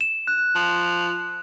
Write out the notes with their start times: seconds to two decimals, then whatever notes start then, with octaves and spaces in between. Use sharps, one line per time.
0.01 E7
0.27 F#6
0.55 F3